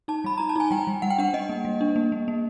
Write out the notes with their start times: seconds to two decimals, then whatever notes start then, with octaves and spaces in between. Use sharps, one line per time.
0.08 D#4 A5
0.24 G3 B5
0.38 D#4 A#5
0.49 A5
0.56 D#4 G#5
0.71 G3 G5
0.87 G3
1.02 G3 F#5
1.10 G5
1.18 D4 F#5
1.33 D4 D#5
1.49 A#3
1.65 G3
1.81 D4
1.96 A#3
2.12 A#3
2.28 A#3